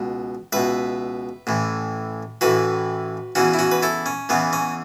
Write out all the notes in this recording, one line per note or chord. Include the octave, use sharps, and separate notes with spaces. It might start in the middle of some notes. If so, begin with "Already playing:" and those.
Already playing: C#2 B2
C#2 B2 B4 E5
A1 A2 E3
A1 A2 E3 F#4 B4
E2 C#3 E3 C#4 F#4
E4
C#4 F#4
B4
E4 A4
C#4
E2 C#3 E3 B3
C#4